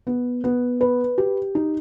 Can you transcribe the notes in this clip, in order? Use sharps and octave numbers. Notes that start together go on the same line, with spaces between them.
B3
B3
B4
G4
D#4